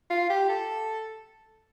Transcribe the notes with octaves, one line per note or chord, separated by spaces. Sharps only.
F4
G4
A4